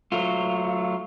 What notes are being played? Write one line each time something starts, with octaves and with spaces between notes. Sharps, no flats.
F#3 A3 F4